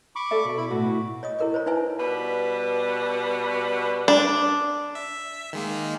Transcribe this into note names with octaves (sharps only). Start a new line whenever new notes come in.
B5 C#6 D6
A4 D5 E5
B2
E4 B5
A2 F#4
C#5 D#5 D#6
E4 A4 A#4 D#5 D6
C5 C#5 A#5
D#4 E4 B4 C#5 E5 G#5
B2 G3 B4
D4
E5
D#3 G#3 A#3